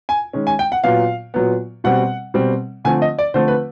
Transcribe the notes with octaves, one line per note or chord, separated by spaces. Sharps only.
G#5
D#3 G#3 C#4
G#5
G5
F#5
A#2 F#3 B3 F5
A#2 F#3 B3
B2 G3 C4 F#5
B2 G3 C4
D3 F3 A3 C4 G#5
D#5
D5
D3 F3 A3 C4 C5
B4